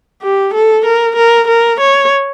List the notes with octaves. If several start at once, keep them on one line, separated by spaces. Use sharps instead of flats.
G4
A4
A#4
A#4
A#4
C#5